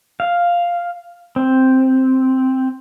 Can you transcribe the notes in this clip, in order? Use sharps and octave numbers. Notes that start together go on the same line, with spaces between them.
F5
C4